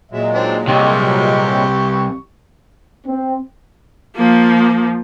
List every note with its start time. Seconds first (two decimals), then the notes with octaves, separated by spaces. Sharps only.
0.12 A#2 F#3 G#3 E5
0.34 C4 D4 D#4
0.68 C2 C3 E3 G4 C#6
3.05 C4
4.16 F3 A#3